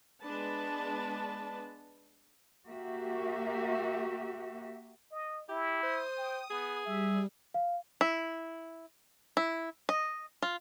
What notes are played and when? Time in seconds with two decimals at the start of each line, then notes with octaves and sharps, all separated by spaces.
0.21 G#3 B3 D4 B4 A5
2.68 A#3 F#4 G4 E5
5.11 D#5
5.49 E4 G4
5.83 C5 D#6
6.18 G5
6.50 B3 G#4
6.86 G3 E5
7.54 F5
8.01 E4
9.37 E4
9.89 D#5
10.42 F4